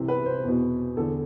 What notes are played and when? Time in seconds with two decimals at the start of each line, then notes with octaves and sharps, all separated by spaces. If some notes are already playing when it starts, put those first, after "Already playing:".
Already playing: C2 C3 E3
0.08 B4
0.26 C5
0.43 E2 B2
0.96 E2 D3 A4